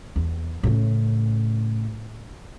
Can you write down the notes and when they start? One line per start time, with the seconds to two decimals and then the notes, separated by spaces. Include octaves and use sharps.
0.16 E2
0.63 A2 C#3